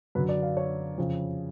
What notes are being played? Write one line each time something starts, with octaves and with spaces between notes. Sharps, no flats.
F#2 D3 B4
D5
F5
C#5
F2 C#3